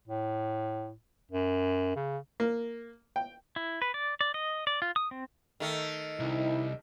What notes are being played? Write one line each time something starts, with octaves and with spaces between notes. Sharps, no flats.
A2
F#2
C#3
A#3
G5
E4
B4
D5
D5
D#5
D5
F4
D#6
C4
D#3 A3
C2 C4 D#4 E4